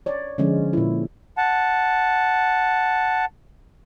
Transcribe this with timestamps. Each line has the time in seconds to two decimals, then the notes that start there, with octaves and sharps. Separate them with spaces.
0.06 C#5 D5
0.38 D3 F3 G#3 C#4
0.73 A#2 E4
1.37 F#5 A5